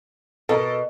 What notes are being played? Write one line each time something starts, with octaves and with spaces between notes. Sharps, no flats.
B2 A4 A#4